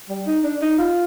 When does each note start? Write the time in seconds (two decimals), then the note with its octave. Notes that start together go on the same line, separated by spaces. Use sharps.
0.09 G3
0.27 D#4
0.44 D4
0.62 D#4
0.78 F4